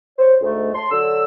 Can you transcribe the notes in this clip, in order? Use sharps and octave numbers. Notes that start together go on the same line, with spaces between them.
C5 C#5
D2 G#2 A3
C#5 A5 C6
D3 F#3 E6